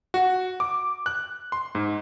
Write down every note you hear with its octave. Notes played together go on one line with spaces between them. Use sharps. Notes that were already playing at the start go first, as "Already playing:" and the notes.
F#4
D6
F#6
C6
G#2